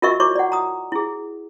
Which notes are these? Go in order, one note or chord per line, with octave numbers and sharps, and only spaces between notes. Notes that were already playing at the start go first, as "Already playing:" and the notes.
F4 F#4 A#4 D#5 E5 C#6
E4 F#4 C#5 A#5 C#6 D6
D5 F#5
A#5 D#6
E4 G#4